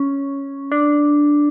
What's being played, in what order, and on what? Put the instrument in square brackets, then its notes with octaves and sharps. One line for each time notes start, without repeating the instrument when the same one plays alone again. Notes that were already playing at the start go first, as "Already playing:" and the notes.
Already playing: [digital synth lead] C#4
D4